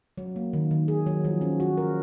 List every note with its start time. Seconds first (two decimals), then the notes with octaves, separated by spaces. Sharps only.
0.18 F#3
0.36 A#3
0.53 D#3
0.71 D#3
0.88 G#4
1.06 F#3
1.24 F3
1.41 C#4
1.60 F#4
1.77 A#4